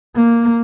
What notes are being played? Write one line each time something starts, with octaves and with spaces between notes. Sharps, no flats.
A#3